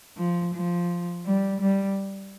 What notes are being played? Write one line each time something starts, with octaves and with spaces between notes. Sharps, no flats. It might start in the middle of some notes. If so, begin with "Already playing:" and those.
F3
F3
G3
G3